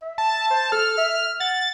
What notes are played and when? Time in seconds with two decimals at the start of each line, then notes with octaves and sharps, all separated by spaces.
0.02 E5
0.18 A5
0.50 C5
0.72 A4 F6
0.98 E5
1.40 F#5 A6